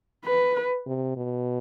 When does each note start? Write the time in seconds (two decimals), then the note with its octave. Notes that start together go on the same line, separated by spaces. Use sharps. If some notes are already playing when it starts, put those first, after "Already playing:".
0.25 B4
0.87 C3
1.16 B2